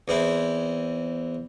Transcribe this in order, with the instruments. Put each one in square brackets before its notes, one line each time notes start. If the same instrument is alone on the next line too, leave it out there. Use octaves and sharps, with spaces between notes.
[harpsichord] E2 C4 E4